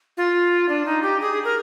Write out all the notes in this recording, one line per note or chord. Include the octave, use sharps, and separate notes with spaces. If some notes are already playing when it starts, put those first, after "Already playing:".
F4
D4
D#4
G4
G#4
A#4